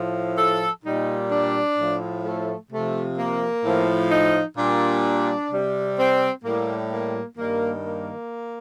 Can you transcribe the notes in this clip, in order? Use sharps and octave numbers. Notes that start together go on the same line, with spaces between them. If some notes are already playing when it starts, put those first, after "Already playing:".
Already playing: A2 F3
A4
A#2 G3 D#4
D4
A2 F3
A3
C3 F3 A3
A#3
A2 F3
D#4
A#2 G3 D4
C3 G3
C4
A2 G3 A#3
A#3
G2 D#3 G3 A#3
A#3